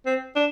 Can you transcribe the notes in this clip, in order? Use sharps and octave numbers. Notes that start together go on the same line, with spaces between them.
C4
D4